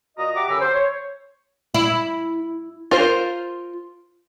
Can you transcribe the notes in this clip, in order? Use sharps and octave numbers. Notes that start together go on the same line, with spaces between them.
A#2 F#4 D#5 A#5 D#6
G4 E5 F#5 A#5 D6
F#2 D3 G4 G#5 B5 E6
C5
C#5
E4
F4 A#4 C5